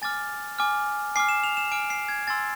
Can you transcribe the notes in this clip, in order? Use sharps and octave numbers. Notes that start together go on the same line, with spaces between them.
G#5 D6 F6 A6
G#5 D6 F6
G#5 D6 F6 C7
E7
F7
E7
G#5 D6 F6 D7
C7
G#6
G#5 C6 E6 A6